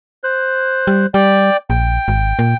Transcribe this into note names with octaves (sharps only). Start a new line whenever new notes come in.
C5 F#6
G3
G3 D5 G5
A#1 G5
G#1
A#2